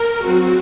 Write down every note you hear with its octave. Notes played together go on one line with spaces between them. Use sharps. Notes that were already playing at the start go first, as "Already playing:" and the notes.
Already playing: A#4
F#3 C4 F#4